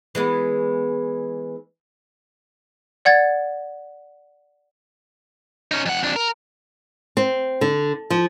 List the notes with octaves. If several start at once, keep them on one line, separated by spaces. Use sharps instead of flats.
E3 G#3 B3
D5 F#5 G#6 A6
C#4 D#4
F2 F#5
F2 D4
A#4
C4
D3
F3